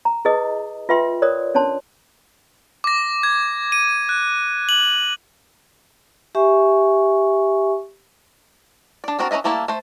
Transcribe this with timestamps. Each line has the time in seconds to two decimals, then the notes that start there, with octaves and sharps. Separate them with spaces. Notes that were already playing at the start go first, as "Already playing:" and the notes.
0.05 A#5
0.25 E4 G#4 B4 D#5 D#6
0.89 F4 B4 E5 G5 C6
1.22 A#4 C#5 D5 D#6
1.55 C#4 D4 C#5 A5 C6
2.84 D6 A#6
3.23 G#6
3.72 D#7
4.09 F#6
4.69 F#7
6.35 G4 E5 G#5 C#6
9.04 D4 D5
9.19 B3 C4 D4 F#4 A#4
9.31 C#4 A#4 B4 D#5 E5
9.44 G3 A3 A#3 E4 A5
9.68 A3 C5